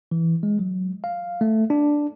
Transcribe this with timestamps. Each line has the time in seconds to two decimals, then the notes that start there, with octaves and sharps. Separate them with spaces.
0.11 E3
0.43 G#3
0.59 F#3
1.04 F5
1.41 A3
1.70 D4